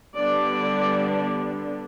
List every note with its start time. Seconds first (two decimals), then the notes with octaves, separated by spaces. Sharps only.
0.16 D3 G3 B3 D4 D5